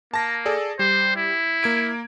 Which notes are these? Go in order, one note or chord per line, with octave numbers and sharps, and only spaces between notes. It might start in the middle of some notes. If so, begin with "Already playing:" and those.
A#3 A5 A#6
G#4 A4 D5
G3 C5
E4
A#3 G#6 D7